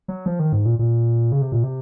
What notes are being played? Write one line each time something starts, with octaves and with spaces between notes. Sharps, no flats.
F#3
F3
D#3
G#2
A#2
A#2
C#3
C3
A#2
C3